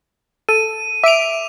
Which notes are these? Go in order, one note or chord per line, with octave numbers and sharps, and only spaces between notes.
A4 D#7
E5 D6 D7 F7